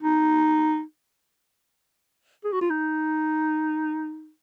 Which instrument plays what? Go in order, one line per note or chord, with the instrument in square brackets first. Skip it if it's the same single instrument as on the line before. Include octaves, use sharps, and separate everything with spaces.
[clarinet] D#4
G#4
F#4
F4
D#4